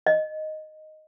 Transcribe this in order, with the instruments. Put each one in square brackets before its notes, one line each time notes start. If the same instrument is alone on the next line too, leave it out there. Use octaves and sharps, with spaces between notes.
[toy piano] D#5